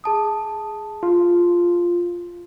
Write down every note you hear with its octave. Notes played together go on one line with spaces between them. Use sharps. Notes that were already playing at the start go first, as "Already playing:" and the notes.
G#4 A5 D#6
F4